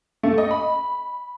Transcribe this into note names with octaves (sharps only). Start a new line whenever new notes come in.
A3
D#5
B5